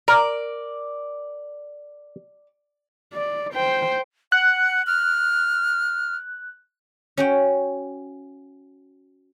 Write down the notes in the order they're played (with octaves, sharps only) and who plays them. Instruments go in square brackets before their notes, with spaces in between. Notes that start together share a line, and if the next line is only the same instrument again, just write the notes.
[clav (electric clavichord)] A#4 [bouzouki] D5
[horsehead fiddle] D5
C5 G5
[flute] F#5 [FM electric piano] F#6
[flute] F6
[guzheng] C#4 F#4 G5